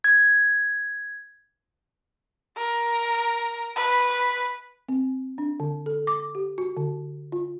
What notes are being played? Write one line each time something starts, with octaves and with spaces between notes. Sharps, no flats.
G#6
A#4
B4
C4
D4
D3
A4
D6
G4
F#4
D3
F4